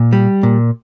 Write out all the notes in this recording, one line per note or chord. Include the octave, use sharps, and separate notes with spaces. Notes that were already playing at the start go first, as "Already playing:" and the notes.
Already playing: A#2
G3
A#2